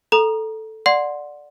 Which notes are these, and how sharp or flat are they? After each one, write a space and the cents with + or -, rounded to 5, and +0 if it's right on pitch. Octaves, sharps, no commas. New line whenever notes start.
A4 +0 A#5 +15 D#6 -30
D5 +0 F#5 -20 C6 +0